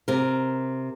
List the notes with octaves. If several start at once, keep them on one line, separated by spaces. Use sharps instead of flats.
C3 A#4